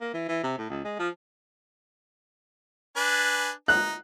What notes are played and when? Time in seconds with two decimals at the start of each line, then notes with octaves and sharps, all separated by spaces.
0.01 A#3
0.14 E3
0.28 E3
0.43 C3
0.58 A2
0.70 C#2
0.85 G#3
0.99 F3
2.97 D4 B4 G#5
3.68 D#4 F#6